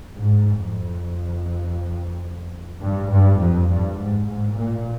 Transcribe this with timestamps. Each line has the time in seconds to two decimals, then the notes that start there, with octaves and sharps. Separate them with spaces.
0.17 G#2
0.61 F2
2.80 G2
3.10 G2
3.39 F2
3.68 G2
3.97 G#2
4.26 G#2
4.54 A#2